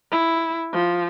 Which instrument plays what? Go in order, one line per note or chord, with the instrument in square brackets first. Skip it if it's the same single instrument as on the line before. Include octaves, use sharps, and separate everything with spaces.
[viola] E4
F3